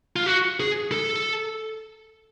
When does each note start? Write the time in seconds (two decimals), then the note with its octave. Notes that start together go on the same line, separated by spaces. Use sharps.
0.16 F4
0.26 F#4
0.60 G#4
0.92 A4